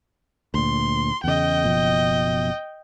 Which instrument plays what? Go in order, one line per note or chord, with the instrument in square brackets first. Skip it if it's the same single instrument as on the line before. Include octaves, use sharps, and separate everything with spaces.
[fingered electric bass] D2 A#2 [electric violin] C6
[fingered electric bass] E2 C#3 [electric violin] D#5 G5
[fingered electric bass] F#1 B2 F3